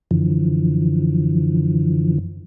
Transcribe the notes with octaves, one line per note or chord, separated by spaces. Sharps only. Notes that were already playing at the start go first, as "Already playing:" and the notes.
F#2 D3 E3 F3